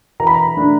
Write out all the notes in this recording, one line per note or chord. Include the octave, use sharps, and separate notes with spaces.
E3 A#5
B5
A#5
A3 D4